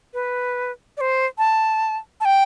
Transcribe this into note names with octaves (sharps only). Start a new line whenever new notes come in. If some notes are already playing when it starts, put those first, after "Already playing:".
B4
D5
C5
A5
A5
G5